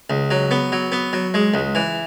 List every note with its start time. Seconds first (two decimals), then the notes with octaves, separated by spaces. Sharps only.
0.10 C#2
0.31 F#3
0.51 B3
0.72 F#3
0.92 B3
1.13 F#3
1.34 G#3
1.54 C#2
1.75 E3